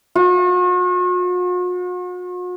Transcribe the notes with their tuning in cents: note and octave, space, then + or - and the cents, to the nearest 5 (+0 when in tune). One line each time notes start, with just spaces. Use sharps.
F#4 -45